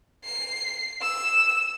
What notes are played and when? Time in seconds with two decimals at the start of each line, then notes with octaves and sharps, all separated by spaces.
0.24 C7
1.01 E6